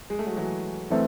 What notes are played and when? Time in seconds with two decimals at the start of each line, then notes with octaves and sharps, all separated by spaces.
0.10 G#3
0.19 A3
0.27 F#3 G#3
0.37 E3 F#3
0.90 E3 A3 C4